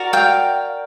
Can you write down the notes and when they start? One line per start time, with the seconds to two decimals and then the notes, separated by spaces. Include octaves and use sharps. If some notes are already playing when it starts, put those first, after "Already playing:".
Already playing: F#4 A#4 D5
0.13 F5 G5